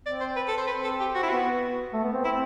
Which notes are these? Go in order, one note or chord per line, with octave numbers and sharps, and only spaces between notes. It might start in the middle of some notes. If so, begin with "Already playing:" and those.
C4 D5
C5
B4
A4
C5
C4 B4
A4
G4
F#4
E4
B3 F#4
A3
B3
C4
C4 E4